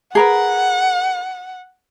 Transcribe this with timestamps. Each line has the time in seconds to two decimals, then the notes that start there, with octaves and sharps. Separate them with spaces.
0.15 G#4 A#4 B4 F#5